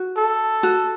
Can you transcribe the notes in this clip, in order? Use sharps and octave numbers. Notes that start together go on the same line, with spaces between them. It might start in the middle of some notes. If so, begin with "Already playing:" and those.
Already playing: F#4
A4
F#4